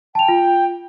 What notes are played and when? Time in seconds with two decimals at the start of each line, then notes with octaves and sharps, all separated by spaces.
0.15 G5 A5 F7
0.28 F4